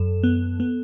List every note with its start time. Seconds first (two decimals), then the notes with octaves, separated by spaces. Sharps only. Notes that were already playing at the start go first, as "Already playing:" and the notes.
Already playing: F#2 A4
0.23 B3
0.60 B3